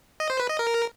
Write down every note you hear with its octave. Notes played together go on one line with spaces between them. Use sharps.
D#5
C5
B4
D#5
A#4